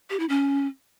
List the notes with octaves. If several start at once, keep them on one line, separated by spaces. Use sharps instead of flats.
G4
E4
C#4